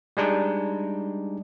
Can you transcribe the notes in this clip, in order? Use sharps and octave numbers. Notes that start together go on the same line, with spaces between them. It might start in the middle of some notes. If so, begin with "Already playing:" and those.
G3 G#3 D4 D#4